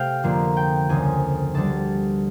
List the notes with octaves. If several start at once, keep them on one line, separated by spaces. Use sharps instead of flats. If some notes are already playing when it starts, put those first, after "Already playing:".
Already playing: C3 A3 F5 G5
F2 D3 F3 A#3
G5
D2 C#3 F3 G#5
D2 D3 G3 A5